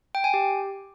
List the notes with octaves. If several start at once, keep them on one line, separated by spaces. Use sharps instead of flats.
G5
G#5
G4